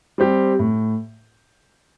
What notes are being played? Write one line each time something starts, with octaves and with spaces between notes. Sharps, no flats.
G3 C4 G4
A2